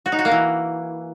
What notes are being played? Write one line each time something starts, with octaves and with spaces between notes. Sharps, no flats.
F#4
D#4
F#4
A#3
E3